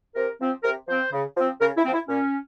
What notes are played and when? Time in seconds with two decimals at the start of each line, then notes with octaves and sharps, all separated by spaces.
0.15 C3 A#4
0.40 F3 C4
0.63 C3 A#4
0.88 F3 C4 C5
1.12 C#3
1.36 F3 C4
1.60 C#3 A#4
1.77 E4
1.85 F3 C4
1.93 E4
2.08 A#2 C#4